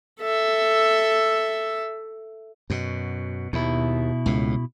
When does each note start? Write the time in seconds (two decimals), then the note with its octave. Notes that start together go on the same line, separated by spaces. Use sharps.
0.20 A4 E5
2.70 F#2 B2
3.53 D#2 B2 E4
4.26 C#2 A2